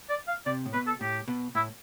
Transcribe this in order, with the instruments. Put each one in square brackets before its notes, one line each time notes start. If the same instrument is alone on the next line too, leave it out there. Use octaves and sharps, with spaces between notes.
[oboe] D5
F5
[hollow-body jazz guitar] C3 [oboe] D5
[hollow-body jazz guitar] A2
[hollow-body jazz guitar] B2 [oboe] B4
[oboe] A4
[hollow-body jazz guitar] A2 [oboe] G4
[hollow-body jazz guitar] B2
[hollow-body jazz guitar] A2 [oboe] E4